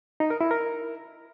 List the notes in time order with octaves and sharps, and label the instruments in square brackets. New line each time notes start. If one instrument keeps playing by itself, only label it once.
[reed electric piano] D#4
A#4
E4
A#4